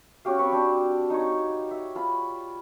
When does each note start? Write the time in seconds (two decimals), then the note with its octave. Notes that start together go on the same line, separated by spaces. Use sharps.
0.25 C#4 F#4 G4 F5
0.39 C4 B5 C#6
0.52 C4 D4
1.10 D#4 C#5
1.71 E5
1.95 F4 B5